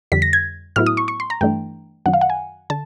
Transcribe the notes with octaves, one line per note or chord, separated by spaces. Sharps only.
F2 D3 G3 B6
A#6
G#6
A2 F#3 B3 E4 F6
D#6
C#6
C#6
C6
A#5
G2 E3 A3 D4 G5
F#2 D#3 F#3 F#5
F5
F#5
G#5
D3 A5